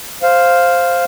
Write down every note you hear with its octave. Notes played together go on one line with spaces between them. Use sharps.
C5 F5